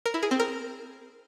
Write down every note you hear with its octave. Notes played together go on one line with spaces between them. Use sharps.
A#4
E4
G#4
C4
A#4